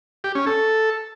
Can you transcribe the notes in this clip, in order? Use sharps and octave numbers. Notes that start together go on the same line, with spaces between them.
G4
C#4
A4